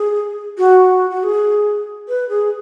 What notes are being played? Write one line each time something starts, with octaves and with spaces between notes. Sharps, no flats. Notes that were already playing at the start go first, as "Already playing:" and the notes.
Already playing: G#4
F#4
F#4
G#4
B4
G#4